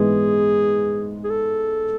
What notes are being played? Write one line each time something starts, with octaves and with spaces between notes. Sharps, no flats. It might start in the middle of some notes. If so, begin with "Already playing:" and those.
Already playing: G#2 E3 G#3 B3 G#4
G#4
A4